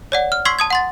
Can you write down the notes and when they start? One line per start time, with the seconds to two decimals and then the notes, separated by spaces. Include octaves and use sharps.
0.12 C#5 D5 F#5
0.32 F6
0.45 C6 C#6 E6 G#6 B6 C7
0.59 A5 D#6 G#6
0.70 F#5 C6 A6